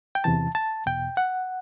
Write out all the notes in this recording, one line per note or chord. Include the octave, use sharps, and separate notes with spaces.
G5
E2 C3 E3 A5
A5
E2 B2 G5
F#5